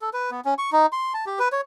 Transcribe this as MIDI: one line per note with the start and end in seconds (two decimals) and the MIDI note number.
0.02 0.10 69
0.13 0.31 71
0.31 0.41 59
0.45 0.54 61
0.58 0.70 85
0.72 0.86 63
0.92 1.13 84
1.14 1.25 81
1.26 1.39 67
1.39 1.48 71
1.52 1.61 73